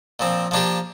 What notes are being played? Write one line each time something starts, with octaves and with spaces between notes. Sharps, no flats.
A#2 F3 C4
F3 A#3 D4 G4